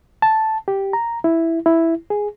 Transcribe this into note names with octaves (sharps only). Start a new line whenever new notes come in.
A5
G4
A#5
E4
E4
G#4